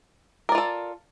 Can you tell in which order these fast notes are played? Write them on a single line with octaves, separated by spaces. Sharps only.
A#4 D5 F4 A4